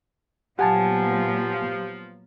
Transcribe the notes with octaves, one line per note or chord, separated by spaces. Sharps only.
A#2 F3 F#3 B3 G4 F#5 G#5 A5